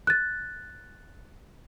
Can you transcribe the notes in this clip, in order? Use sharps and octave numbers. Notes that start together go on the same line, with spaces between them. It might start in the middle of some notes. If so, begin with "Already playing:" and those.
F#6 A6